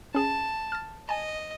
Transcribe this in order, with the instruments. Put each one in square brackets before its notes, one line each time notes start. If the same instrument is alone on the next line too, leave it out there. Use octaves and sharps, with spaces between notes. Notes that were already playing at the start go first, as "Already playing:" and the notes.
[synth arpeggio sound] C#4 G#4 [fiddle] A5
[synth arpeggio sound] F6 A6
[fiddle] D#5 [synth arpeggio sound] G#5 A5